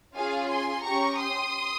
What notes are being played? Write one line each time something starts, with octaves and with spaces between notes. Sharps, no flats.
C#4 F4 G#4 F5 G#5
G#5 C6
C#4 G4 A#5 C#6
C6 D#6